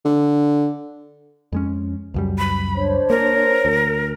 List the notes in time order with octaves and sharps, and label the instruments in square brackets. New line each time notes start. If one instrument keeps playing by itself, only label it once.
[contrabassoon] D3
[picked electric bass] F2 G#3 C#4
C#2 F#2 G3
[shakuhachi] B5
[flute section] D4 C5 C#5
[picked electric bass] A#3 [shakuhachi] A#4
[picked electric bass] D2